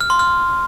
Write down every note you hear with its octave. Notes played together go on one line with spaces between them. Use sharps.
F6
C6
F6